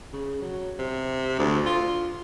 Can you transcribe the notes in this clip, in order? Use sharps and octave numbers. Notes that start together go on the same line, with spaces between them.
C#3
F#3
C3
D2
F4